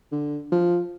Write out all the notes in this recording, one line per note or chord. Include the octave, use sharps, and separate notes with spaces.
D3
F3